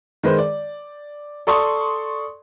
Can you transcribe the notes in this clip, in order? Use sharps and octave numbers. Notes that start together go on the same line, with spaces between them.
D#3 G#3 B4 C5
D5
A4 D5 C6 C#6 D#6